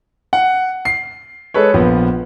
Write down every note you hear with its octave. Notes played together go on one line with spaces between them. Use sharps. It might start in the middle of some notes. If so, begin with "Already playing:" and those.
F#5
C7
G#3 A4 B4 C#5
A#1 F3 B3